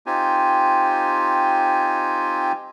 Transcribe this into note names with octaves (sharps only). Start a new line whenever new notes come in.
C4 D#4 F4 G4 G#5